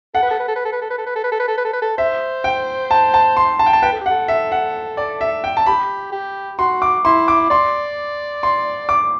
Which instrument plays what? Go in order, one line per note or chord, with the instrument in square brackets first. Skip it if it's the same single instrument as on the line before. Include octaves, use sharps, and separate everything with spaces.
[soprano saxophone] A4 [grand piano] F#5
[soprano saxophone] B4
A4
B4
A4
B4
A4
B4
A4
B4
A4
B4
A4
B4
A4
B4
A4
B4
A4
B4
A4
[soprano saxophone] C5 [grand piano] E5
[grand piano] G5
A5
A5
C6
A5
G5
A5
[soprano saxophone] B4 [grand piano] G5
[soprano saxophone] A4
G4
[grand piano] F#5
[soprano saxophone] A4
[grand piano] E5
F#5
D5
E5
G5
A5
[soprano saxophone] G4 [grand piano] B5
[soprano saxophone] G4
[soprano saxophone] F#4 [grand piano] C6
[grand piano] D6
[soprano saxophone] E4 [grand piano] C6
[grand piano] D6
[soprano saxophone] D5 [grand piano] C6
[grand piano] C6
D6